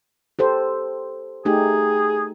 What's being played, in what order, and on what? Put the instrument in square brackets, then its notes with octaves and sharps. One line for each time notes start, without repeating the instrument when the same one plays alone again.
[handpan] G4 A4 C5
[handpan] A3 D#4 G4 [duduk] G#4